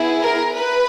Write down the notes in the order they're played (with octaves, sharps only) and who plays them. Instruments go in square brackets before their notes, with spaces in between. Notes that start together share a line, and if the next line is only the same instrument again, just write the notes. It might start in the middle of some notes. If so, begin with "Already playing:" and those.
Already playing: [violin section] B3 E4 G#4
A#4
B4